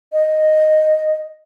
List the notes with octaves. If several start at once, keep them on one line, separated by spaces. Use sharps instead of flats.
D#5